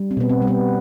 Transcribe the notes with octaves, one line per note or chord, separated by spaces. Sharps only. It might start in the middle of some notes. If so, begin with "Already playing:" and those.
Already playing: G3
C4
B2 B3
C4
G3
B3